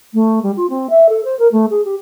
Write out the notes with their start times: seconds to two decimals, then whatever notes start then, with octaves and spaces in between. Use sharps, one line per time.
0.14 A3
0.43 G3
0.56 F4
0.70 C4
0.90 E5
1.09 A4
1.25 C5
1.39 A#4
1.52 A3
1.70 G#4
1.85 G4